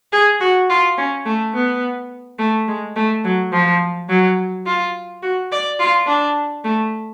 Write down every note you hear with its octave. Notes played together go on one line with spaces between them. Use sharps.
G#4
F#4
F4
C#4
A3
B3
A3
G#3
A3
F#3
F3
F#3
F4
F#4
D5
F4
D4
A3